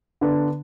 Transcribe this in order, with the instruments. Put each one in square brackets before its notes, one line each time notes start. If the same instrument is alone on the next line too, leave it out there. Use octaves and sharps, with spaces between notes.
[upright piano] D3 B3 D4